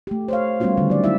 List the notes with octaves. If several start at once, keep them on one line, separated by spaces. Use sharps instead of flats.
A3 G4
C5 C#5 F5
G3 A3 B3 C#4 F4 F#4
D3 D#3 G3 C#4
F#3 D5
G#3 E4 E5